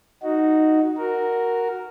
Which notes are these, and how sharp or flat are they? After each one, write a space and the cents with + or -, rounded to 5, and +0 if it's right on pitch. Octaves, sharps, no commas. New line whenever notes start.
D#4 +0 F#4 +0
F#4 +0 A#4 +0